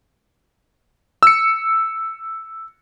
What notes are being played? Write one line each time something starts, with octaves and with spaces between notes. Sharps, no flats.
E6 C#7